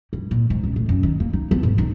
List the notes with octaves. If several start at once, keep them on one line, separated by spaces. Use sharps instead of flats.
G2
A#2
G#2
C#2
A2
F#2
D#3
A#3
D#4
B3
G#2
D#4